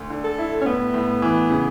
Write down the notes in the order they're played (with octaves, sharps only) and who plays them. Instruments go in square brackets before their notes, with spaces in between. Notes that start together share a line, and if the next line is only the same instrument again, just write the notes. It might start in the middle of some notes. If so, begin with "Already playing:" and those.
Already playing: [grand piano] D2
D3
[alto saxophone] A4
[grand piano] E4
[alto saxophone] C#4
[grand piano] A2 [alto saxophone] B3
[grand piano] A2
E3
C#3